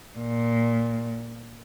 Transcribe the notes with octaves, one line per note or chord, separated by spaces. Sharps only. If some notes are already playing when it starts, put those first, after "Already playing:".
A#2